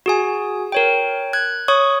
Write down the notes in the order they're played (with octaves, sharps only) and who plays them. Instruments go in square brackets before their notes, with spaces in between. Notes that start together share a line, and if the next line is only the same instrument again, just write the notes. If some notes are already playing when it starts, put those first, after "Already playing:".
[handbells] F#4 G#4 G#5
A#4 C#5 G5
F#6 G#6
C#5 C#6 D#6